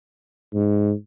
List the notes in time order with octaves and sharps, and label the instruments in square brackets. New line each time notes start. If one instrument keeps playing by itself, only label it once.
[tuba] G#2